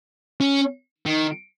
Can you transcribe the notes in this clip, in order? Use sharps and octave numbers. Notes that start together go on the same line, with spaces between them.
C#4
D#3